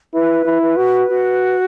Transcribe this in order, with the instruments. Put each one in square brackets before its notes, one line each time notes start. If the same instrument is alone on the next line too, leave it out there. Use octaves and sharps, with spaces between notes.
[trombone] E4 [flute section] B4
[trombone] E4
[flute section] B4
[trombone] F#4
[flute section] F#4